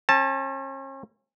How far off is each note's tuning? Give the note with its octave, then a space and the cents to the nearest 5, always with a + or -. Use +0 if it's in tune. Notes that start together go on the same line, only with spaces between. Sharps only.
C#4 -40 A5 +0